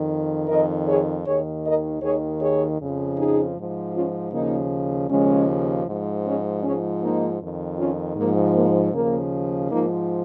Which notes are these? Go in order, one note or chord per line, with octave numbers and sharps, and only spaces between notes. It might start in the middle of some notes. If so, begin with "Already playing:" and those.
Already playing: F2 D#3
F2 D#3 A#4 D#5
G#4 C#5
D#2 D#3 G#4 C#5
A#4 D#5
D#2 D#3 G#4 C#5
G#4 C#5
F2 C#3 F3
D#4 G#4
G#2 F3
C#4 F4
D#2 C#3 F3 A#3 D#4
D#2 C#3 F3 G#3 C#4
G#2 F3
G#3 C#4
G#2 F3 G#3 C#4
A#3 D#4
F2 D#3
C#4 F4
G#2 F3 A#3
A#3
D#2 C#3 F3 A#3
G#2 F3 A#3 D#4